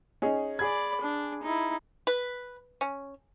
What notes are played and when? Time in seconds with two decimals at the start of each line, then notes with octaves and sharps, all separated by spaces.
0.22 C#4 D#4 G#4
0.59 G#4 D5 B5 G#6
1.01 D4
1.43 D#4 E4
2.07 B4
2.81 C#4